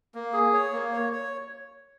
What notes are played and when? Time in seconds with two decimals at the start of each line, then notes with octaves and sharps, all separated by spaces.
0.15 A#3
0.33 G#4
0.53 C#5
0.73 A#3
0.93 C#5
1.13 C#5